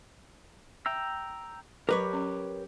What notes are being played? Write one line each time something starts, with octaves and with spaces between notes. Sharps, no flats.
E5 G5 A#5 E6
F#3 G4 A#4 B4 C#5 D6
F#3 C#4